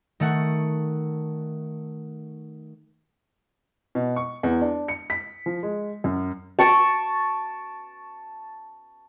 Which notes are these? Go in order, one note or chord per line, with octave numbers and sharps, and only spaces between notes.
D#3 A3 F#5
B2
C#6
E2
D4
C#7
B6
F3
G#3
F#2
A5 C#6 D6